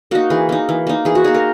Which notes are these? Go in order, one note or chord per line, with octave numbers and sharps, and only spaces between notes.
A#3 D#4 F#4
E3 G#4
A#3 D#4
E3
A#3 D#4
E3 G#4
F#4
A#3 D#4 G#4
A#4